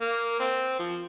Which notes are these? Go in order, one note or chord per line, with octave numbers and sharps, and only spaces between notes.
A#3
C4
F3